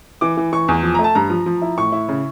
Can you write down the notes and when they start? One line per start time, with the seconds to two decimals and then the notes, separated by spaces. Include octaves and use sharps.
0.21 E3 D6
0.37 E3
0.53 E3 C#6
0.68 E2
0.83 F3
0.94 A#5
0.99 A3
1.04 A5
1.15 G2 A#5
1.30 F3
1.46 F3
1.62 E4
1.78 A2 C#6
1.92 E4
2.09 C#3